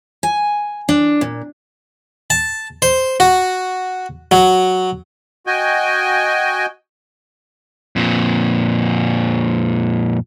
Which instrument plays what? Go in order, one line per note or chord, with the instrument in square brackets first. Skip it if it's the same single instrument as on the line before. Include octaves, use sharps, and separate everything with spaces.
[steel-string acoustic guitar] G#5
D4
A#2
[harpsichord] A5
C5
F#4
F#3
[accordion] F#4 D#5 G5 G#5
[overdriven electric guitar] F2 A#2